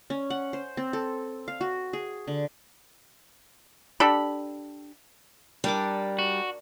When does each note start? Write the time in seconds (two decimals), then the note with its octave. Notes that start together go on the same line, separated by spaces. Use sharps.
0.10 C#4
0.30 F#5
0.53 C5
0.77 C4
0.93 A4
1.48 F5
1.61 F#4
1.93 G#4
2.28 D3
4.00 D4 G4 A4 B5
5.64 G3 D4 A#4 D6
6.19 F#4